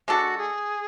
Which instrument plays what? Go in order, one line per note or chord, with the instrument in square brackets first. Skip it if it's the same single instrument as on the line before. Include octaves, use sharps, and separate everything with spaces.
[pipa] G#3 D4 A4 [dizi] F#4
[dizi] G#4